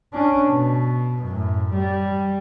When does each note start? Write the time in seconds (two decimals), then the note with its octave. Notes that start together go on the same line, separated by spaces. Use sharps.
0.13 C#4 D4
0.49 B2
1.24 F#2 A2
1.74 G3